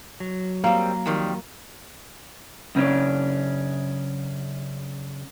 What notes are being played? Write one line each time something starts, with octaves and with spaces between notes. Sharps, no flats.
F#3
G3 A#3 C4
F2 D#3 G3
F#2 C#3 A#3 C#4 D4